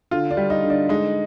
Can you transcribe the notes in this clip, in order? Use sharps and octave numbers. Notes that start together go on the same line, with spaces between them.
D3 F4
D4
G3
D#4
D3
D4
G#3 D#4